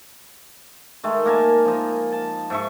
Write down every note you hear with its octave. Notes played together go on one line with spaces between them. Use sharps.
D#3 G#3 A3
A#3 A#4 G#5 A5
F3 D#4
A5
G#2 E5 C#6